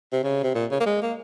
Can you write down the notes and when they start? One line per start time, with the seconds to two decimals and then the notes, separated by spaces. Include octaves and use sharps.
0.12 C3
0.24 C#3
0.43 C3
0.55 A#2
0.71 C#3
0.80 A#3
0.86 G#3
1.02 A#3